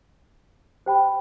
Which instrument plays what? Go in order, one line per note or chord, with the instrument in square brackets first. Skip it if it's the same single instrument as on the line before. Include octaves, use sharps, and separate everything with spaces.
[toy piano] G4 C5 G5 B5